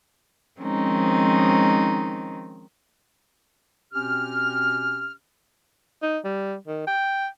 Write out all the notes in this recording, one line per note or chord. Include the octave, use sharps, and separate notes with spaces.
D#3 F3 G#3 C4 C#4 D#4
B2 C4 C#4 G4 F6
D#4
G3
D#3
G5